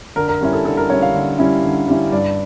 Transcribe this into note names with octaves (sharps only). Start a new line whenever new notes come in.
D3 A#4
A#4
G3 C#4 E4
A4
D3 A4
A#4
G3 C#4 E4 C#5
F5
D3
G3 C#4 E4
D3
G3 C#4 E4
G2 D5